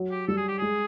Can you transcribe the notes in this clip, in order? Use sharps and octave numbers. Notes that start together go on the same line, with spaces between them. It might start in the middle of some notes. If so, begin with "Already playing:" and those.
Already playing: F#3
G4
G3 A4
G#4
G4
G#3 G#4